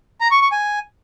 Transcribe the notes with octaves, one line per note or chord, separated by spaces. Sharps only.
A#5
C#6
C#6
G#5